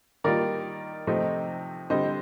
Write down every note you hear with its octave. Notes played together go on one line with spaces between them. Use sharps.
D#3 G3 A#3 F4 A#4 D5
C3 F3 A3 C4 D#4
D3 G3 C4 C5 D#5